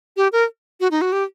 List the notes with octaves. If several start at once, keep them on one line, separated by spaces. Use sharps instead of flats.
G4
A#4
F#4
D#4
F#4
G4